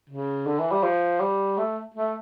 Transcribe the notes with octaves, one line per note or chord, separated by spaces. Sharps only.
C#3
D3
E3
G3
F3
G3
A3
A3